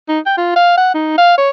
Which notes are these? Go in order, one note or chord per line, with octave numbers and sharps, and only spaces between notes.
D#4
G5
F4
F5
F#5
D#4
F5
C#5